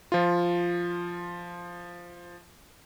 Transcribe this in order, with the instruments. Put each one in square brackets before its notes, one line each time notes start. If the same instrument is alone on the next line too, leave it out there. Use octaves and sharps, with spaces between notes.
[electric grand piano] F3 F4